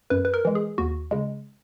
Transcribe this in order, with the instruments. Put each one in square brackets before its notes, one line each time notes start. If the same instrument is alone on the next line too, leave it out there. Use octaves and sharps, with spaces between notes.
[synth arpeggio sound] F#2 B4
B4
A#4
E3 G#3
G#4
D#2 F#4
C#3 G#3